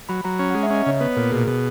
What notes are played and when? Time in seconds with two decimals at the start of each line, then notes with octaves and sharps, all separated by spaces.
0.09 F#3 B5
0.24 F#3 A#5
0.39 C#4
0.50 G#3 F#5
0.63 E5
0.70 C#4
0.75 D#5
0.86 C#3 C#5
1.01 B3 B4
1.17 A#2 A#4
1.32 B2 G#4
1.47 B2 G#4